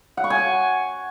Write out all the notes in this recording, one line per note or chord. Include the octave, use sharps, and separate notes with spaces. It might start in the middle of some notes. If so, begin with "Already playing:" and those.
F#5
C#6
G#5